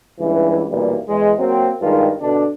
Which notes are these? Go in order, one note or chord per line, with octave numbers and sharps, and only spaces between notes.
C#2 G2 E3
B1 A#2 E3 G3
E2 G#3
F#3 A#3 C4
G2 D#3 G#3 F4
B2 D3 D4